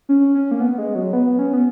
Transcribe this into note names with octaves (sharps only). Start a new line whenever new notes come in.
C#4
C#4
A#3
B3
G#3
F#3
B3
C#4
B3